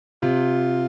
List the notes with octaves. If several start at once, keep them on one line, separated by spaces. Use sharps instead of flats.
C3 F4